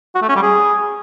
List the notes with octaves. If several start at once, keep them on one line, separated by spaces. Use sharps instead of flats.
F#4
A3
C#4
G3
G#4